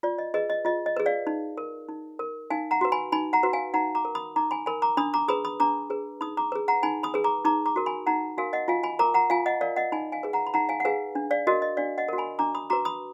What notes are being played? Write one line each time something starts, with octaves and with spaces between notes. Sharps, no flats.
F4 D5
D#5
G#4 B4 D#5
D#5
F4 D#5
D#5
G#4 B4
D5 F5
D#4
A#4
D#4
A#4
D#4 F5 G#5
F#5 A#5
F#4 B4
G#5 B5
D#4 G#5 B5
F#5 A#5
F#4 B4
F5 G#5
D#4 F#5 A#5
A#5 D6
A#4
B5 D#6
D#4 A#5 D6
G#5 B5
A#4 G#5 B5
A#5 D6
D4 B5 D#6
A#5 D6
G#4 B4 B5 D#6
B5 D#6
D4 A#5 D6
G#4 B4
D#4 B5 D#6
A#5 D6
G#4 B4
F#5 A#5
D#4 G#5 B5
B5 D#6
G#4 B4
A#5 D6
D#4 A#5 D6
A#5 D6
F#4 A#4
G#5 B5
D#4 F#5 A#5
F#4 A#4 F5 G#5
D#5 F#5
F4 F5 G#5
G#5 B5
A#4 A#5 D6
F#5 A#5
F4 F5 G#5
D#5 F#5
A#4 D5 F5
D#5 F#5
D#4 G#5 B5
F5 G#5
G#4 B4
F#5 A#5
B5
D#4 F#5 A#5
F5 G#5
F#5
G#4 B4 F5 G#5
D4
D5 F5
F#4 A#4 D#5
D#5
D4 D5 F5
D#5 F#5
F#4 A#4
G#5 B5
D4 A#5 D6
B5 D#6
F#4 B4 A#5 D6
B5 D#6